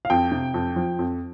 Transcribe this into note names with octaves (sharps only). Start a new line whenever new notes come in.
F5
F2 G5
C3
F2
F3
F2